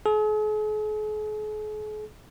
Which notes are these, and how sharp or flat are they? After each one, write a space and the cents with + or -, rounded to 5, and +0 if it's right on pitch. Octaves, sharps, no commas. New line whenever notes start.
G#4 +45